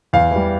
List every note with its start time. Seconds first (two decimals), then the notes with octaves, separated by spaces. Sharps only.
0.13 E2 F5
0.31 E3 G3